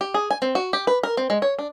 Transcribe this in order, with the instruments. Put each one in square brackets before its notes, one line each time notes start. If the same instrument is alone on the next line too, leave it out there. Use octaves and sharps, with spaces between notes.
[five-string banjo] G4
G#4
G#5
C4
F#4
G4
B4
A#4
C4
G#3
C#5
D4